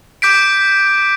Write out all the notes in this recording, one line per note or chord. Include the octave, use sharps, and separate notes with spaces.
D6 G6 B6 D7